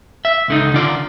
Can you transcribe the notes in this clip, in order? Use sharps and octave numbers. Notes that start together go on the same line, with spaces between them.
E5
C#2 D3 D#4
D3 D4 F4 A#4 D5